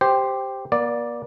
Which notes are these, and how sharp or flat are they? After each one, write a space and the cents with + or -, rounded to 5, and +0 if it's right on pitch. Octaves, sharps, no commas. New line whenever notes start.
G4 +0 C5 +0
A#3 +40 D5 +0